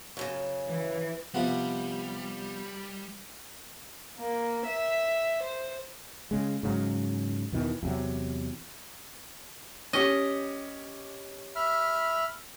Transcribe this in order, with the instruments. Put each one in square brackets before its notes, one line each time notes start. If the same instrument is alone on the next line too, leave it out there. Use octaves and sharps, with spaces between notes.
[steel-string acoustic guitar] F#2 A#2 C#3
[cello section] E3
[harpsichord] C3 F3 B3 [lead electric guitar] G3
[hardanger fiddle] A#3
E5
C5
[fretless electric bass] C#3 G#3
G#2 C#3 F#3
E2 B2 D#3 E3
E2 C3 F#3
[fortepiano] C#4 G4 [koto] D#5
[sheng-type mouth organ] E5 B5 F6